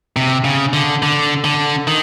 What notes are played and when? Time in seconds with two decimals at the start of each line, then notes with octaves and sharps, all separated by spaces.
0.17 C3
0.45 C#3
0.73 D3
1.03 D3
1.44 D3
1.87 D#3